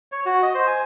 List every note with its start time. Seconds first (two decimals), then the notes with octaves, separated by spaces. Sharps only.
0.12 C#5
0.26 F#4
0.42 D#5
0.54 C5
0.67 G#5